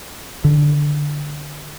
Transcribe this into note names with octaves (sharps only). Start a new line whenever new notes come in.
D3